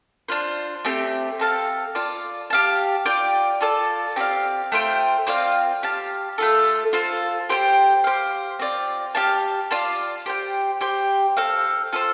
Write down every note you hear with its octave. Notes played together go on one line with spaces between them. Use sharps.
D4 F4 C5
A3 C4 G4
C4 A4 F5 A5
F4 D5 A5
G4 F5 A5
F4 D5 G5
F4 A4 D5 A5
C4 G4 D5 F5
A3 F4 C5 G5
C4 F4 D5 F5
G4 F5 A5
A3 F4 A4
F4 A4 C5
G4 C5 G5
G4 C5 F5
C4 F4 D5
G4 F5 A5
F4 D5 F5 A5
G4 C5 G5
G4 C5 G5
C4 A4 F5
F4 A4 C5